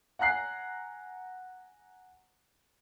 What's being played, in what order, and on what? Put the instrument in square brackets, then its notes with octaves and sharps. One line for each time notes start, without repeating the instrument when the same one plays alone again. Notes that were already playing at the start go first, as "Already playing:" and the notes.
[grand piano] F#5 G#5 A#5 F#6 C7